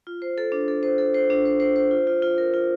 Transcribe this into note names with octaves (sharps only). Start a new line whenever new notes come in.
F4
C5
A4
D4
A4
C5
A4
C5
D4
C5
C5
C5
F4
F4
F4
A#4
F4